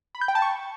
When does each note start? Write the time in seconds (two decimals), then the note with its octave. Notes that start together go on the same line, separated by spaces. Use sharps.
0.15 B5
0.21 G6
0.28 G5
0.35 A5
0.42 C#6